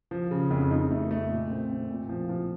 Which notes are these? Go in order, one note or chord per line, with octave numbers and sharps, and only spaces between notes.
F3
C#3
F2
D#4
A3
A3
A#2
C4
C4
A#2
F3
F3